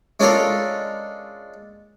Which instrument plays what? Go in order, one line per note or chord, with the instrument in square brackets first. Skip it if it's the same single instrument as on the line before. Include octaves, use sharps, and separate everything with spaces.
[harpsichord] G#3 C#4 D4 F4 A4 A#4